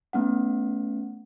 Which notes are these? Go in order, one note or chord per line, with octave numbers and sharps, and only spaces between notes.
A3 B3 C#4 F#5